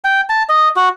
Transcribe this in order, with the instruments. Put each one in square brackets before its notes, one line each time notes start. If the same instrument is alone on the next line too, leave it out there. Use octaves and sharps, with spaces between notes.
[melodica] G5
A5
D#5
F#4